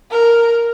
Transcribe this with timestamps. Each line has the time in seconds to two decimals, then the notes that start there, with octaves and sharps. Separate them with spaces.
0.11 A#4